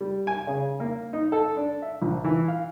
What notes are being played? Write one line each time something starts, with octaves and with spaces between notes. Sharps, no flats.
G3
G#5
C#3
A#3
D#4
A4
D4
E5
A#1
E3
F5